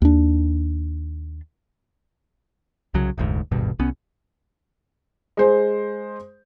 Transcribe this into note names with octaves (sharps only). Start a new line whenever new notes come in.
D#2 D4
C2 C#3 F#3
F1 D2 G#2
D#1 G#1 G2 B2
C2 B3 C#4
G#3 C5